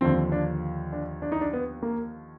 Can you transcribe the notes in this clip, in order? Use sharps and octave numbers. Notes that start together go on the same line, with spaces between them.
D#2 D3 F3 C4
D4
D4
D4
D#4
D4
B3
A#3